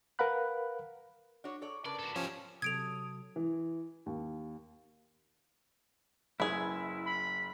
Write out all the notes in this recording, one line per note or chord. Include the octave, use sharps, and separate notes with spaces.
A#4 B4 F5 F#5 B5 F#6
D4 F#4 C#5
A4 C#5 D5
C#3 D4 A#4 B4 D5
F#4 A4
F3 G3 C#4 G#4 E5
C3 F#3 A4 D#6 G#6 D7 F7
E3
D#2
F#1 E4 G#4 B4
B5